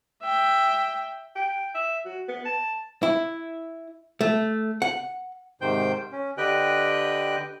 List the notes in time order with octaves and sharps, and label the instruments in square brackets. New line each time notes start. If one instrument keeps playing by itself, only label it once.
[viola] E5 G5
[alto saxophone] G5
E5
F#4
B3
A5
[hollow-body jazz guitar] E4
A3
F#5
[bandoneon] G#2 C3 D#3 C5 G5 G6
C#4
D3 G4 B4 D#5 G5 F#6